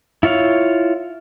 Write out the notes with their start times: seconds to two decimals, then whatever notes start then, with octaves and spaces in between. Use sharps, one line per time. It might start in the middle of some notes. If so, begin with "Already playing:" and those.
0.23 E4 F4 C#5 F5